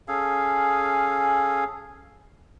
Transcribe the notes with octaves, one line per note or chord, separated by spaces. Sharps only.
C#4 G#4 A4 F5